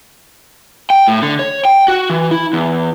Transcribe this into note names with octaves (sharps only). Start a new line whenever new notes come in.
G5
A2
D3
C#5
G5
F#4
E3
E4
E2